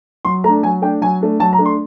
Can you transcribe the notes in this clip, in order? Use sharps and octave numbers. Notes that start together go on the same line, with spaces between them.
F#3 C6
A3 D4 A#5
F#3 G#5
A3 D4 G5
F#3 G#5
A3 D4
F#3 A5
A#5
A3 D4
C6